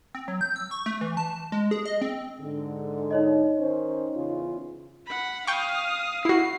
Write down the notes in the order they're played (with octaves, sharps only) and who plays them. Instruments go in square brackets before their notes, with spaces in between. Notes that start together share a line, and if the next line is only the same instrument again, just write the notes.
[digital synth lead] C4
F#3
G6
E6
C#6
A3
E3
A5
G#3
G#4
D#5
C4
[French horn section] G#2 D3
[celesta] D#4 C#5 D#5
[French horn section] D#3 C#4 C5
E2 C#3 F4
[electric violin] F#5 B5
[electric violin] F5 D#6 [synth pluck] G5 C#6
[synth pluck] E4 F#4 [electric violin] C7